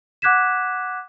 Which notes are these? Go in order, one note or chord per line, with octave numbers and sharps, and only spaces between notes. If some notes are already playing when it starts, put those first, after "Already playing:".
F#5 D6 F#6 G#6 B6 E7